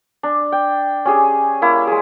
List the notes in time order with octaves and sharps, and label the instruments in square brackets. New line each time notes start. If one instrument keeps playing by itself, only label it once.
[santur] D4
G5
C#4 G4 G#4
A#3 E4
G#3 G#4